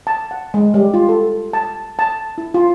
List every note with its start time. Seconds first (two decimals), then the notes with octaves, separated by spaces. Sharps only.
0.07 A5
0.31 F#5
0.54 G#3
0.74 G3
0.94 F4
1.09 A4
1.53 A5
1.99 A5
2.38 E4
2.54 F4